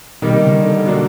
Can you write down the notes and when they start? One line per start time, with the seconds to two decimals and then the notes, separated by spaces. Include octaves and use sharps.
0.22 B2 D#3 G3 A#3 D#4
0.33 C3
0.43 C#3
0.54 D3
0.85 B2 D3 F#3 A#3 D4